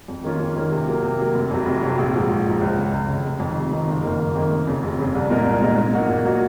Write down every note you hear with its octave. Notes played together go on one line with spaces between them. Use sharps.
F2
D#3 A#3 C#4 F4
F2
D#3 A#3 C#4 F4
C3
F#3 A#3
C3
F#3 A#3
F1
F2 C3 F#3
F1
F2 C3 F#3
A#1
G#2 F3
A#1
G#2 F3
C#2
C#3 G#3
C#2
C#3 G#3
F1
F2 D#3
F1
F2 D#3
F#1
F2 D#3 A#3
F#1
F2 D#3 A#3
F1
F2 C#3
F1
F2 C#3
C2
A#2 G#3 D#4 A#4
C2
A#2 G#3 D#4 A#4
A#2
F#3 A#3 D#4 F#4
A#2
F#3 A#3 D#4 F#4